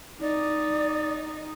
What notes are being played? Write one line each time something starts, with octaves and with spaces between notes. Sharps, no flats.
D#4 D5